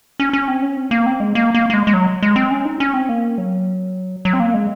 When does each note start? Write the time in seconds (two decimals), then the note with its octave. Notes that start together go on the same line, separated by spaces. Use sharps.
0.20 C#4
0.33 C#4
0.48 C4
0.62 C#4
0.77 C4
0.91 A#3
1.06 C4
1.20 G#3
1.35 A#3
1.54 A#3
1.70 A#3
1.74 G#3
1.87 G#3
1.94 F#3
2.23 G#3
2.36 C4
2.51 C#4
2.65 D#4
2.80 C#4
2.94 C4
3.09 A#3
3.38 F#3
4.25 F#3
4.33 C4
4.40 A#3
4.54 G#3